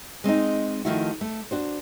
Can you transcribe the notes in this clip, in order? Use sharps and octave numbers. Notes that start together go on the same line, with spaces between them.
G#3 C4 C#4 D#4
D#3 F3 A3 E4 F#4
A3
D4 F#4 C5